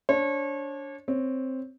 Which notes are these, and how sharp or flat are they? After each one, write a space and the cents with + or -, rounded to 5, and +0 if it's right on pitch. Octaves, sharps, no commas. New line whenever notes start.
D4 -25 C#5 -35
C4 +0 C#5 +0